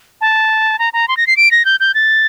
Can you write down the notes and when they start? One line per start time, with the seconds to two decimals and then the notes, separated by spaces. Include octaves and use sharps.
0.21 A5
0.79 A#5
0.93 A#5
1.08 C6
1.17 A#6
1.27 C7
1.37 D7
1.51 A#6
1.65 G6
1.80 G6
1.95 A6